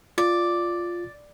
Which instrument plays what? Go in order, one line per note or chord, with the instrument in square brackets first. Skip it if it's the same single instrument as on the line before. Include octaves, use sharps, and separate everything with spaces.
[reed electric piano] F4 [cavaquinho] D5